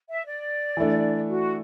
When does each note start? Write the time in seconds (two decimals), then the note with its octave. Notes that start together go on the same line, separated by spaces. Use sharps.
0.08 E5
0.25 D5
0.77 E3 A3 D4
1.29 F#4